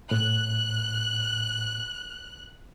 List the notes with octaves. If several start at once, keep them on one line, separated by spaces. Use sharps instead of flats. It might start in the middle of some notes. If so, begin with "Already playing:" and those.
A2 F#6